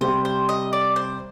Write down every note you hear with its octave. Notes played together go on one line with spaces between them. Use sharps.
C3 G3 C4 G4 C5
C5
D#5
D5
C5